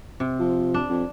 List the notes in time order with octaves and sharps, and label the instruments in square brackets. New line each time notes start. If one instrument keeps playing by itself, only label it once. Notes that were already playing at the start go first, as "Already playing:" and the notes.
[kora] C3
[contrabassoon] F3
[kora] D4
[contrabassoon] F2